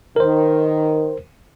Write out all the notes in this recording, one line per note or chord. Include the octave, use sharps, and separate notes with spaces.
D#3 A#4 C5